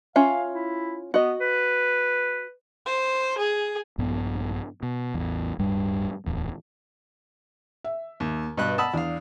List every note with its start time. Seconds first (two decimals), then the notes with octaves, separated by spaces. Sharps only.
0.16 C#4 F4 E5 F5
0.54 E4
1.14 B3 F#4 D#5
1.40 B4
2.86 C5
3.38 G#4
3.98 A#1 G2 A#2 B3
4.83 B2
5.14 A1 E2
5.59 D1 G2 G3
6.26 D1 E2
7.84 E5
8.20 D#2
8.57 G2 B2 B4 F#6
8.78 F#5 A5 B5 D#6 E6
8.94 E2 D4 F5